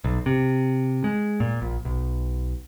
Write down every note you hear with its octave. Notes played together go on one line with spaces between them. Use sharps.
B1
C3
G#3
A#2
A#1
B1